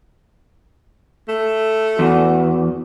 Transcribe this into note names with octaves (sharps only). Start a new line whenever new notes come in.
A3
E2 F#4